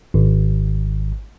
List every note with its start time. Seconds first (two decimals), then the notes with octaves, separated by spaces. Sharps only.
0.14 G#1